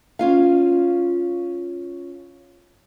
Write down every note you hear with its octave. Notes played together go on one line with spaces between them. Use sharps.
C#4 F4 F5